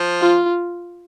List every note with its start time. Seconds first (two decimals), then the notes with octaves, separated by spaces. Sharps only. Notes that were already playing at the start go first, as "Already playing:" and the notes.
Already playing: F3
0.21 F4